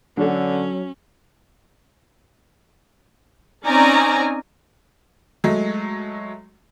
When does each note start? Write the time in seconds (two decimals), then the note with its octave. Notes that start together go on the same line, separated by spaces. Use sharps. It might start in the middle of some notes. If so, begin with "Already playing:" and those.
0.17 D3 F#3 C#4 D4 A4
3.64 C4 C#4 D#4 D5 G#5 A#5
5.44 F#3 G#3 A3